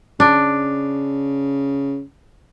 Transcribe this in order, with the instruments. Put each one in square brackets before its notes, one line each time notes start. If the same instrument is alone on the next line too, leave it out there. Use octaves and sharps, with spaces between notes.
[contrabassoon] C#3 [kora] D4